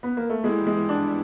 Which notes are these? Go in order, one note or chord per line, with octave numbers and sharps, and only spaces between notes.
B3
A#3
A3
E3 G3 G#3 B3 E4
G#3
D4